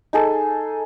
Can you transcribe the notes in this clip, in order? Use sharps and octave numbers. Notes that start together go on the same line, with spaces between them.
D#4 G#4 A4